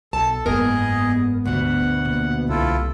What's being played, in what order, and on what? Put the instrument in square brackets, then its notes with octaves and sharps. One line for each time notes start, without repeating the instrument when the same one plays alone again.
[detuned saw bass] B1 [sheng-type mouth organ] A4 [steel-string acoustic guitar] A5
[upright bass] F#1 G#2 [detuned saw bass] B3 [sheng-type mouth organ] G#4 D#5 [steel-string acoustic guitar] A#4
[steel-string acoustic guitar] D2 B2 [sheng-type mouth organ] F#5
[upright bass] A#2
[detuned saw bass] C2 [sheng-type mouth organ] E4 F4 A4